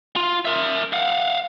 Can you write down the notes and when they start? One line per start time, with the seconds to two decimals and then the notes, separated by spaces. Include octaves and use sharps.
0.16 F4
0.45 A#4 E5
0.93 F5 F#5